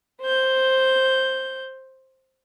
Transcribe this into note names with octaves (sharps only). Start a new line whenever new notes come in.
C5 G6